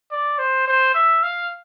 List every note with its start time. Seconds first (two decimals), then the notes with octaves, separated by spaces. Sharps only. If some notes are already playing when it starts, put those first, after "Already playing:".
0.11 D5
0.39 C5
0.67 C5
0.95 E5
1.23 F5